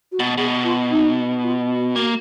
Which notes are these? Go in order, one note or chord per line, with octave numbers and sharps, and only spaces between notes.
F#4
B2
B2 G#4
F4
D#4
F4
F#4
A#3